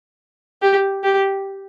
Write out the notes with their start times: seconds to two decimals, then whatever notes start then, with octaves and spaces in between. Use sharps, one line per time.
0.62 G4
1.04 G4